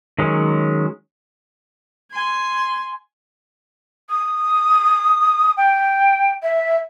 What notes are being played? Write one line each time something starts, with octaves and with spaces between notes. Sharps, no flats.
D#3 F#3 G#3 C#4
G#5 C6
D#6
G5
E5